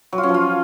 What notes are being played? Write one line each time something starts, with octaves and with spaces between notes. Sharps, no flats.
F#3
F4
C#4
F3
F4